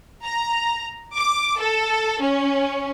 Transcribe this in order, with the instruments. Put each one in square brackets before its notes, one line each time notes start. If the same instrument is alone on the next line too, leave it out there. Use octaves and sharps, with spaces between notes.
[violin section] A#5
D6
A4
C#4